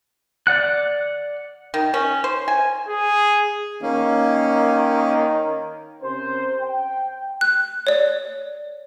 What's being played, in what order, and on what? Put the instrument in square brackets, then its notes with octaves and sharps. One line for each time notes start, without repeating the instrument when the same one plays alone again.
[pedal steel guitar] D5 F#5 F#6
[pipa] D#3
C#4
C5
G#5
[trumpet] G#4
[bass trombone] D#3 [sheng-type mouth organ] A#3 C#4
[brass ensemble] C3 C#4 G4 A#4 C5
G5
[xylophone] F#6
C#5 D5